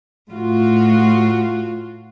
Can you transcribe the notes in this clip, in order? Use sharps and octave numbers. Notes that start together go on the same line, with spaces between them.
A2 F4 F#4